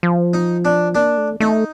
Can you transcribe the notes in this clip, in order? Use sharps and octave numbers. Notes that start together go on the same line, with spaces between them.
F3
D#4
D4
A#3 D4
A3
A3 D#4